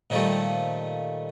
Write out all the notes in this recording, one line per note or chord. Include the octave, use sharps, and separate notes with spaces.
A#2 D#3 F3 G3 A3